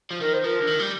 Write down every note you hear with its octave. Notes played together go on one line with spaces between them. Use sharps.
F3
D#3 A#4
C5
F3 A#4
D3
D#3
G3